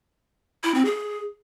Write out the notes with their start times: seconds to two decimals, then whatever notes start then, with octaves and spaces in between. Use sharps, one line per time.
0.64 E4
0.74 C4
0.85 G#4